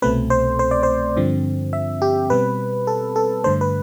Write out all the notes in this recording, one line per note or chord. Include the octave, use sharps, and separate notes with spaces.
C2 B2 A3 C4 B4
C5
C5
D5
C5
G2 D3 F3 C4
E5
G4
B2 G3 C4 B4
A4
A4
G2 D3 A3 C5
B4